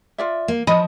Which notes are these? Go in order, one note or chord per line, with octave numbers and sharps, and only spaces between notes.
F4 D5 E5
A#3
F3 D#5 B5